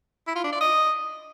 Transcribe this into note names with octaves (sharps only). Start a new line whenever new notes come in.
E4
F4
D4
D5
D#5